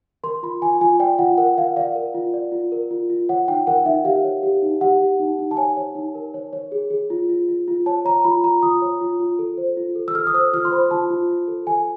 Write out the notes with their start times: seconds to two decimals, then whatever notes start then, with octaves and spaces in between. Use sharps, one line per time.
0.24 A#4 C6
0.43 F4 B5
0.62 F4 G#5
0.81 F4 G#5
1.00 D5 G5
1.19 F4 F#5
1.38 A#4 F#5
1.57 A#4 F5
1.76 D5 F5
1.95 A#4
2.14 F4
2.34 D5
2.52 F4
2.72 A#4
2.91 F4
3.10 F4
3.29 C#5 F#5
3.48 D#4 G5
3.67 A#4 F#5
3.85 D#4 E5
4.04 G4 F5
4.24 C#5
4.43 G4
4.62 D#4
4.81 G4 F#5
5.00 G4
5.20 D#4
5.39 D#4
5.51 A5
5.57 C#5 G#5
5.77 C#5
5.95 D#4
6.15 A#4
6.34 C#5
6.53 C#5
6.72 G#4
6.90 G#4
7.10 F4
7.29 F4
7.48 F4
7.68 F4
7.86 C#5 A5
8.05 C#5 A#5
8.24 F4 B5
8.44 F4 A#5
8.63 F4 D#6
8.82 C#5
9.01 F4
9.20 F4
9.39 A4
9.57 C5
9.77 F4
9.95 A4
10.08 E6
10.15 A4 F6
10.27 D#6
10.34 C5 E6
10.53 F4 F6
10.65 C6
10.72 C5 B5
10.91 F4 A5
11.10 F4
11.29 F4
11.48 A4
11.67 A4 G#5